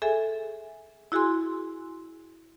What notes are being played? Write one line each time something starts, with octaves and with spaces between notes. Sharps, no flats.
G#4 A4 E5 G#5
E4 F#4 G#4 G#5 C6